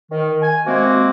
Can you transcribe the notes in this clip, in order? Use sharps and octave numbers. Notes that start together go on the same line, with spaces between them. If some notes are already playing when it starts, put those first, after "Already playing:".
D#3
G#5
C3 G#3 A#3 C4 F#4